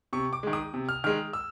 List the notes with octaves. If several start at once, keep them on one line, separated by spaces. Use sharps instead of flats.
C3 C#6
D6
D#3 G#3
D#6
C3
F6
D#3 G#3 F6
E6